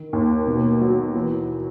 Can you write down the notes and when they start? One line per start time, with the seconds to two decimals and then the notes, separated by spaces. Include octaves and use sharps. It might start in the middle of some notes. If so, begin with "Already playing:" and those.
Already playing: D#3
0.13 D#2
0.47 B2
0.81 F#3
1.15 E3